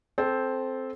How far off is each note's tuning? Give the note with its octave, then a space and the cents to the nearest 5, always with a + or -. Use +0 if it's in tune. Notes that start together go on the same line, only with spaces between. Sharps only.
C4 +0 A4 -15 C5 +0